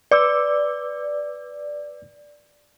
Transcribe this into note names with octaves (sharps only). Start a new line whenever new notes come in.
B4 D5 D6 E6